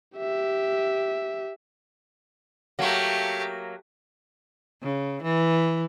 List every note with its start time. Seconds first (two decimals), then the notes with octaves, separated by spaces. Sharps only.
0.17 G4 E5
2.79 F#3 A3 A#3 G4
4.83 C#3
5.23 E3